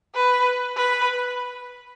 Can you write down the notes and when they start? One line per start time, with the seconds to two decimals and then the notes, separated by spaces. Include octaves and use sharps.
0.15 B4
0.76 B4